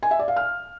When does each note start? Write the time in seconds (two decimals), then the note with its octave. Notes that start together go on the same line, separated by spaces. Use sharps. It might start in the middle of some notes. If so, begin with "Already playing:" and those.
0.03 G#5
0.11 E5
0.19 D5
0.28 F5
0.36 F6